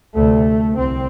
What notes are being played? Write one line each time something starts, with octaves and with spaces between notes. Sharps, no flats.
D2 C3 A3
C2 C4